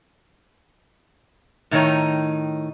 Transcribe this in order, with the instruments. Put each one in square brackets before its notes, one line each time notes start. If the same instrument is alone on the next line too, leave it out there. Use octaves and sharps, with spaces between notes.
[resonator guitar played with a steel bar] A2 D#3 D#4 C#5